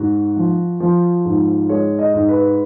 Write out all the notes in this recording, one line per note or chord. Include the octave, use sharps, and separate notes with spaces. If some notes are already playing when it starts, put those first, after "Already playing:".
Already playing: G#2 F#4
F3
F3
G#2
G#3 C#5
D#5
G#2
B4